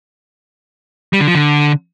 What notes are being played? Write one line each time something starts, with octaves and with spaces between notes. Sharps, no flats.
G3
D3
F3
D3